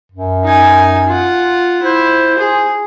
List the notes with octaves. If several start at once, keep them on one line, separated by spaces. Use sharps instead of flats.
F#2
D#4 G#5
F4 F#5
E4 C5
G#4